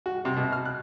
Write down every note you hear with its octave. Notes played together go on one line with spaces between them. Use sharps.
F#4
C3
B2
F6
F#6